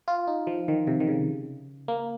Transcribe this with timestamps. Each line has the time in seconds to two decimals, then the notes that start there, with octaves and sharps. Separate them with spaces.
0.08 F4
0.27 D#4
0.47 F3
0.68 D#3
0.87 C3
1.00 D#3
1.07 C#3
1.88 A#3